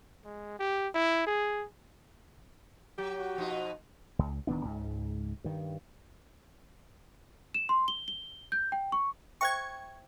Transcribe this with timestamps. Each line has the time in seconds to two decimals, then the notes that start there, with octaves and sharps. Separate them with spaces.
0.24 G#3
0.59 G4
0.94 E4
1.27 G#4
2.98 F#3 G4
3.15 F#4
3.36 B2 F3 D#4
4.19 C#2
4.47 D1 D#3 B3 D4
4.65 C#2 G#2
5.44 G2 D#3
7.54 E7
7.69 C6
7.88 G7
8.08 G7
8.52 G6
8.72 G5
8.92 C#6
9.41 C5 E5 G5 C#6 G#6